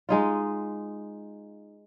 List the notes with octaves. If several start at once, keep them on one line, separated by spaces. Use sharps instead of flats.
G#3 D#4 F4